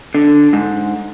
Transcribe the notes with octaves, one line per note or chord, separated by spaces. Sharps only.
D3
G#2